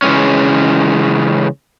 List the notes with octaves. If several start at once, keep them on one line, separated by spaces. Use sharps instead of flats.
C#3 E3 G#3 C#4